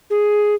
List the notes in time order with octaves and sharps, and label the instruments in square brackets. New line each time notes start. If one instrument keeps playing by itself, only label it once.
[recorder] G#4